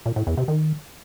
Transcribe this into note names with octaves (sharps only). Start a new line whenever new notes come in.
A#2
A2
E2
C3
D#3